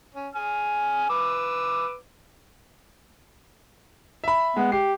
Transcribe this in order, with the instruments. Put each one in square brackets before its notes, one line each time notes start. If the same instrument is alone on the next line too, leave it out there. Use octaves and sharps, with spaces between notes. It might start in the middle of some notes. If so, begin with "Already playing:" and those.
[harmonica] C#4
G#4 G#5 F6
B4 D6 E6
[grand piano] E5 B5
[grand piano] G#3 [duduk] B3
[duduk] G4 [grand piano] C7